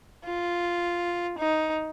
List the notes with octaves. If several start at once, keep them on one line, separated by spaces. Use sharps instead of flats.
F4
D#4